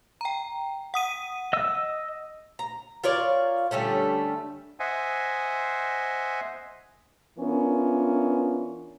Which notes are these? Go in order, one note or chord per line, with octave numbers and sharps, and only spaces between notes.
G5 A#5
F#5 D#6 D#7
D#5 E6
A#5
F4 A#4 C#5 D5
D3 G3 A3 C#4
C5 D#5 E5 F#5 G#5
E3 B3 C#4 D4 F4 A#4